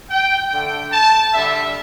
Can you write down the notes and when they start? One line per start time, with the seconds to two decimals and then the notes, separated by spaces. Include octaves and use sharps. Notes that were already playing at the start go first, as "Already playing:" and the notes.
0.10 G5
0.51 D3 A3 G5
0.92 A5
1.34 D3 G3 E5